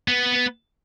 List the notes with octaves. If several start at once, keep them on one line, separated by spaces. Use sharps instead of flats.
B3